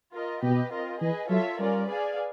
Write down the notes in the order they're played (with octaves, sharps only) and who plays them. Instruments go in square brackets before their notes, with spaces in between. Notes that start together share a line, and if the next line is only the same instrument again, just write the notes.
[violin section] F4 A#4 D#5
[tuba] B2 [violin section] G4 B4 D#5
[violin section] C4 F4 A#4 D#5
[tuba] E3 [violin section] G#4 B4 D#5 G#5
[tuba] F#3 [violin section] F4 A4 C#5 E5
[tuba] G3 [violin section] C#4 F4 A#4 D5
[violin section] G#4 B4 D5 F5 G#5